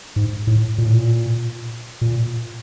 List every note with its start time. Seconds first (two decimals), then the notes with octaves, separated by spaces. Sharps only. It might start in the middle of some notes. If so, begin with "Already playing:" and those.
0.16 G#2
0.47 A2
0.78 A#2
0.85 A2
0.93 A#2
2.01 A#2